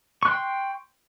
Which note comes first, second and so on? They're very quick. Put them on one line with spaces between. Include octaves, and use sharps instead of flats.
C#6 F#6 C6 G5